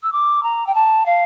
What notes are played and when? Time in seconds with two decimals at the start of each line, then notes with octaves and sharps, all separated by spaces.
0.03 E6
0.12 D6
0.43 A#5
0.67 G5
0.75 A5
1.06 F5